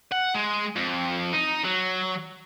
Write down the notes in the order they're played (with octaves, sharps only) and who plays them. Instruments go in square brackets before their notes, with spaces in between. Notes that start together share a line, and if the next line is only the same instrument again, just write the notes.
[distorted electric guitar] F#5
G#3
F2
D#4
F#3